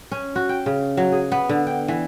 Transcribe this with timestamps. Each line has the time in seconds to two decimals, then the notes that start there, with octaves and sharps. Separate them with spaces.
0.11 C#4
0.36 F#4
0.49 G5
0.66 C#3
0.97 F#3
1.12 G#4
1.32 B3
1.49 D3
1.67 G5
1.88 E3